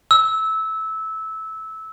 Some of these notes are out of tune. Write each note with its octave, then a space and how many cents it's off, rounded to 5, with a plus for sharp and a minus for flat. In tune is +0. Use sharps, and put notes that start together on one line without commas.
E6 -20